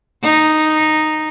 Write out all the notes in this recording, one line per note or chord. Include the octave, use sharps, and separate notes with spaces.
D#4